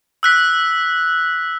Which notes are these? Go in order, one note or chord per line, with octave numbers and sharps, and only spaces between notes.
E6 F#6 B6